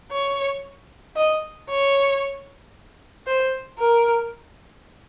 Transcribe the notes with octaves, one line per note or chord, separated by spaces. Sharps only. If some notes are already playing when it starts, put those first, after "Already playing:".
C#5
D#5
C#5
C5
A#4